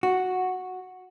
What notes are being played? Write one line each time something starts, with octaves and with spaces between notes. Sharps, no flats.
F#4